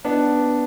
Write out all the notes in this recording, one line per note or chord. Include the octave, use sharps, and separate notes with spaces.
B3 D4